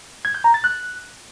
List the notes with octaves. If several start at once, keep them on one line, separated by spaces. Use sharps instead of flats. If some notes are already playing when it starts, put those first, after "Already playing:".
G#6
G6
A#5
A6
F#6